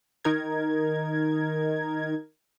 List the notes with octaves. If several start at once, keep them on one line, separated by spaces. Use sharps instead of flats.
D#3 D#4 A#4 G#6